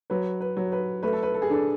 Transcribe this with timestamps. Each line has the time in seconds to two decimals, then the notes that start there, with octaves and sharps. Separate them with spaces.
0.10 F#3 B4
0.41 B4
0.57 F#3
0.72 B4
1.03 A3 B4
1.13 A4
1.23 B4
1.34 A4
1.42 G#4
1.50 D4 A4